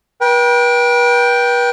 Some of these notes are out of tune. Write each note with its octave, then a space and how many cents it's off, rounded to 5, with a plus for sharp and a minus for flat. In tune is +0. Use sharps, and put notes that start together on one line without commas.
B4 -40 G5 +0